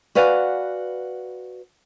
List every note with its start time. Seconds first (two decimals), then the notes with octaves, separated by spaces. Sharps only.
0.15 F#4 B4 D5 F5 F#5 G#5